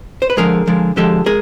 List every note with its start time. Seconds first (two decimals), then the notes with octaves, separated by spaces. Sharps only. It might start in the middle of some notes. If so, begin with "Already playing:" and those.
0.22 C5
0.30 B4
0.37 D3 F3 G#3 G#4 A#4
0.67 D3 F3 G#3
0.96 D3 F3 G#3 G4 A4
1.26 G#3 G#4 A#4